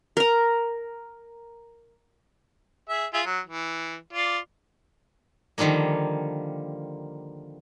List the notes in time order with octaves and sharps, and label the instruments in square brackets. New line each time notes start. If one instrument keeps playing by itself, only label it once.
[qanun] A#4 A#5
[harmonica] G#4 E5
F4 G#4 E5
F#3
E3
F4 D5
[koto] D3 D#3 F3 G3 A#3